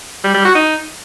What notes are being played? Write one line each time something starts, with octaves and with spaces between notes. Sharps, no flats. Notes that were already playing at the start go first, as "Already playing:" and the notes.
G3
G3
F#4
D#4